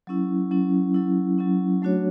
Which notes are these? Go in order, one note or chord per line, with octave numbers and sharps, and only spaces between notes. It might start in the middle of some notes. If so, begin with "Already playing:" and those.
F#3 C#4 E4
F#3 C#4 E4
F#3 C#4 E4
F#3 C#4 E4
F#3 A3 D4 F#4 C#5